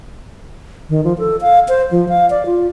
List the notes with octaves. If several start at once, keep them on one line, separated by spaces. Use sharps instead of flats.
D#3
F3
A4
F5
C5
F3
F5
D5
F4